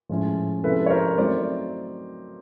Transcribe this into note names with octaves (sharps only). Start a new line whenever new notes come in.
A2 F3 G#3 C#4 E4
C3 F3 G#3 C#4 E4 A4 B4
C#5
A#4 C5
F#3 A3 C4 D#4 C5 D5